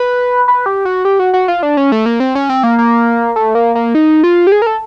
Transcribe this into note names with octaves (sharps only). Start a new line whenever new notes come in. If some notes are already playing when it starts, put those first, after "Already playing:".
Already playing: B4
B4
G4
F#4
G4
F#4
F#4
F4
D4
C#4
A3
A#3
C4
C#4
C4
A#3
A#3
A3
A#3
A#3
D#4
F4
G4
G#4
A#4
A4